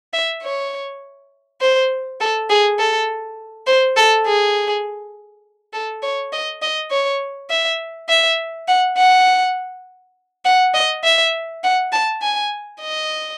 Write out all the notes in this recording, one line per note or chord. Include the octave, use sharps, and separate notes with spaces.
E5
C#5
C5
A4
G#4
A4
C5
A4
G#4
A4
C#5
D#5
D#5
C#5
E5
E5
F#5
F#5
F#5
D#5
E5
F#5
A5
G#5
D#5